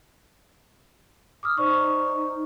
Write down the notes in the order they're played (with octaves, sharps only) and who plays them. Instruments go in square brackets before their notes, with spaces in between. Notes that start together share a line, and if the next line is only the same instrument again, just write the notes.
[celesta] D6 D#6 F6
[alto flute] D#4 [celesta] C5 D5 C#6